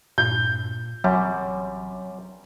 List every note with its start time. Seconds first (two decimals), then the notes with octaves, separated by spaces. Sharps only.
0.18 G2 A#2 G6
1.04 A1 F#2 C3 F#3 G3